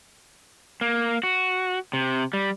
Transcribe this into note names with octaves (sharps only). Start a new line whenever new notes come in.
A#3
F#4
C3
G3